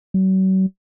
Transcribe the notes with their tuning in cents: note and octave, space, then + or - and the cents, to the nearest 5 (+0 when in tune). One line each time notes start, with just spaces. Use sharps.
F#3 +40